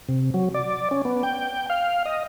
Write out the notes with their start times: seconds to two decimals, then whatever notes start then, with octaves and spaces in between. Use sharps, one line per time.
0.09 C3
0.34 F#3
0.54 D5
0.91 C#4
1.05 B3
1.23 G5
1.70 F5
2.06 D#5